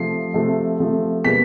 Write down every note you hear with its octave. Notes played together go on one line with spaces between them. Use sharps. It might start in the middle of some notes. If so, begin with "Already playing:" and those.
Already playing: C3 F3 A3 C7
C3 F3 A3
C3 F3 A3
B2 G3 A#3 B6